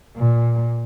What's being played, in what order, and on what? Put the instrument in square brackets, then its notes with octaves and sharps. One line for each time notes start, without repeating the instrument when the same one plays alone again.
[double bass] A#2